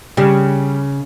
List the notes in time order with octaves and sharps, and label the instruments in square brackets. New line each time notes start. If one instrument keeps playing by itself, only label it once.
[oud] C#3 [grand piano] G3